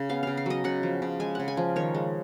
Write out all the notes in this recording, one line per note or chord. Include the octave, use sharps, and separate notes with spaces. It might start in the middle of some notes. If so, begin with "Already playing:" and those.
Already playing: C#3
B3 F5
C#3 F5
F5
F#3 D#5
C#3 F#5
F3
C#3
G#3 G#5
C#3 F#5
G#5
F3
D#3 C#5
G#3